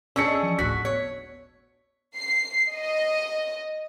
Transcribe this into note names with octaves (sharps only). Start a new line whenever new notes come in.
C#4 D4 G#4 E6 C#7
D#5
E3 F3 G#5
G1 D2 A2 F#4 B6
B3 C#5
C7
D#5